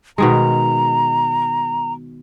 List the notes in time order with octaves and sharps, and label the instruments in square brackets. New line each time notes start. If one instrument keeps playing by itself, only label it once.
[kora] B2 D#3 G#3 [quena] A#5